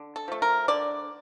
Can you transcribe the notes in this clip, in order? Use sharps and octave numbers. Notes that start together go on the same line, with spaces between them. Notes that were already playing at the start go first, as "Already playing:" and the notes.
Already playing: D3
A4
F3 A3
A#4
D3 D5